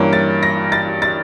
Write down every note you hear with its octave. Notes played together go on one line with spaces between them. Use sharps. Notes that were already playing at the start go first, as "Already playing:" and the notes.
Already playing: G2 E3 A#3 C#4
A6
A#6
A6
A6